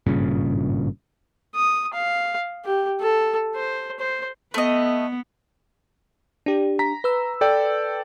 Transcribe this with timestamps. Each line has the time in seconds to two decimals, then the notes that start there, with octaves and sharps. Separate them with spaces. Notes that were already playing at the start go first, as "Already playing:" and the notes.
0.06 G#1 G2 A#2 C#3
1.55 D#6
1.93 F5
2.65 G4
3.01 A4
3.55 C5
3.99 C5
4.54 A3 B3 D#5
6.46 D4 G4
6.79 A#5 B6
7.04 B4 E6
7.41 A4 D5 G5